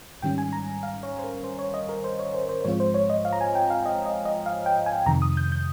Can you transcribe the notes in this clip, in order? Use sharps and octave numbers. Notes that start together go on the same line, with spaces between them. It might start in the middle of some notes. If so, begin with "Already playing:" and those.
G#2 D#3 G3 C#4 G5
G#5
A#5
F5
C#5
C5
A#4
C5
C#5
D#5
A#4
C5
C#5
C5
C5
G#2 F3 G#3 C4 F4 C#5
C5
C#5
D#5
F5
A#5
G#5
G5
F5
D#5
D#5
D#5
F5
G5
G#5
F2 C3 D#3 A#5
D#6
G6
G6